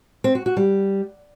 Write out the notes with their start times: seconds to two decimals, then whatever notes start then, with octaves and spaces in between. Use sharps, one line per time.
0.24 C4
0.35 F#4
0.46 F#4
0.57 G3